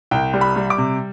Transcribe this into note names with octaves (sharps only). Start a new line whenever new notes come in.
C2 G5
G3
B5
G3
D6
C3